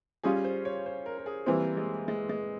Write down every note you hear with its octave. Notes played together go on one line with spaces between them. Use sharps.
G3 C#4 F4 G#4
C5
C#5
C5
A#4
A#4
G#4
E3 G3 A#3 C4
G#3
G#3
G#3